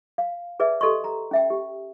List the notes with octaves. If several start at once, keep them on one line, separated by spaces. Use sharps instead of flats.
F5
G#4 B4 D5 E5
G4 A4 D#5 C6 C#6
A#5
C#4 E5 G5
G4